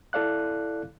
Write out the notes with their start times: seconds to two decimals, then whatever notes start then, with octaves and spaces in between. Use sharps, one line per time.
0.13 E4 A4 D5 F5 F#6